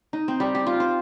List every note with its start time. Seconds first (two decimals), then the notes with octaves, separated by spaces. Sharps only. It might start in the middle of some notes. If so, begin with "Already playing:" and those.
0.13 D#4
0.28 C4
0.40 G3
0.55 G4
0.67 F4
0.80 C5